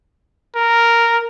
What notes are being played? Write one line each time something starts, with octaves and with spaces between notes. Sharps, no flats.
A#4